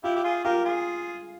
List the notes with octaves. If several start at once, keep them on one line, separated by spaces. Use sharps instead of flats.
E4 F4 G4
G4
F4 G#4
F4 G4 A#4
F4 G#4